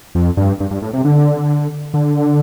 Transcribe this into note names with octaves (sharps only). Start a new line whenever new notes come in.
F2
G2
G2
G2
A2
C3
D3
D3